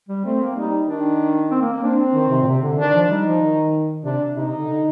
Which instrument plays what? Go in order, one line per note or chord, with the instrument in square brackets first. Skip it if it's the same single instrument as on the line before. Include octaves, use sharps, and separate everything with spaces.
[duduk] G3
[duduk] A3 [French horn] C4
[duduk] A#3
[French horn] G3 [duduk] D#4
[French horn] D#3 [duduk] D4
[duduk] C4
A#3
A#3
[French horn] C4 [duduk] D4
[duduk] D#3
C3
A#2
C3
D3
[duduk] D#3 [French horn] D4
[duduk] F3
[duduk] G3 [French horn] D#4
[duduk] F3
D#3
[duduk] C3 [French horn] D4
[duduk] C3 [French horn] D#4
[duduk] C3
D3
D3